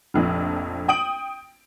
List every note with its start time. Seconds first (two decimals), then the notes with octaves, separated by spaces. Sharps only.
0.14 F1 A#1 F2
0.88 G5 D#6 D7 F#7